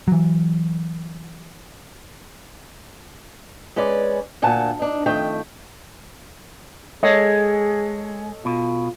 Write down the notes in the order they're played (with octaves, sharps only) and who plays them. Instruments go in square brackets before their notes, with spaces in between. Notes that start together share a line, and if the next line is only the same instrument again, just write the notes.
[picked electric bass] E3 F#3
[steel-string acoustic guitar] G#3 C#4 B4 D5
D2 A#2 F#5 G#5 A5
D4 D#4
F2 D#3 A3 G5
[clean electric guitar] G#3 [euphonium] G#4 [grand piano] A4 C#5 D#5
[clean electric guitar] B2 [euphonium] F4